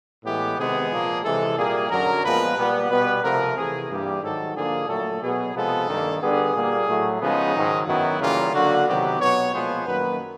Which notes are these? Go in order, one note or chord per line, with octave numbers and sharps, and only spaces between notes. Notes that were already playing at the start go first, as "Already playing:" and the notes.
A2 E3 G#3 B3 G4
C3 D#3 G#3 B3 G#4
A#2 F3 A#3
C3 E3 G#3 A4
A#2 G3 A#3 G#4
F#2 D3 F#3 A#4
A#2 F3 G#3 B3 B4
A#2 G3 B3
B2 G3 B3 B4
C3 F3 A3 A#4
C3 E3 A3 G#4
G2 E3 G3 A#3 G4
G#2 D#3 F#3 A4
D3 F3 A#3 G#4
A#2 F#3 A3 A4
B2 F#3 B3 G#4
C3 F3 G#3 B3 A4
G2 D#3 G3 A#3
D3 G3 B3 G#4
A#2 G3 A#3
A2 F#3 A3
C#3 F3 G#3 B3 D#4
G#2 D#3 F#3
F#2 D#3 F#3 B3 E4
C#3 E3 G3 A#3 F4
D3 F#3 A#3 F#4
C3 D#3 F#3 B3 G4
B2 F#3 B3 C#5
A#2 F3 G#3 B3 C5
F#2 D#3 F#3 A#3 B4